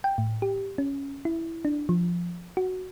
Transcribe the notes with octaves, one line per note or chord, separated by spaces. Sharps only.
G5
A2
G4
C#4
E4
D4
F3
F#4